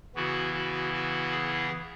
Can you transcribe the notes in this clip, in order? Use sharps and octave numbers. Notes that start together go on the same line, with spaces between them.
C#3 E3 B3 E4 F#4
F#4
F#4
G#4